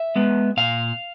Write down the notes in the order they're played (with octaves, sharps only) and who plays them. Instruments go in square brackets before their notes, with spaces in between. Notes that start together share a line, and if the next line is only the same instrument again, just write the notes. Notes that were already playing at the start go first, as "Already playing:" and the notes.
Already playing: [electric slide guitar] E5
G#3 B3
A#2 F5